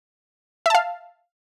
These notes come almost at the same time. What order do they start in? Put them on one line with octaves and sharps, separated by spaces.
E5 A5 F5